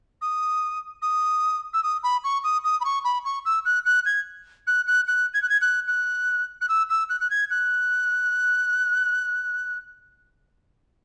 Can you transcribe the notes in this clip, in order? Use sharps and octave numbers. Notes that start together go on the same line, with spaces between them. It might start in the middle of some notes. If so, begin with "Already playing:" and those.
D#6
D#6
E6
D#6
B5
C#6
D#6
D#6
B5
C#6
B5
C#6
E6
F#6
F#6
G#6
F#6
F#6
F#6
G#6
F#6
G#6
F#6
F#6
F#6
E6
E6
F#6
F#6
G#6
F#6